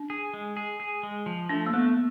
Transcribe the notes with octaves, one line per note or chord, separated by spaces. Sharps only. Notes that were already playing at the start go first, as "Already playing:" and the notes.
Already playing: D4
G#4
G#3
G#4
G#4
G#3
F3
A3 D4
A#3
A3 B3